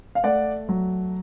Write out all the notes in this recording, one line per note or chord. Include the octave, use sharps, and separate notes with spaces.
F5
A3 D5 F#5
F#3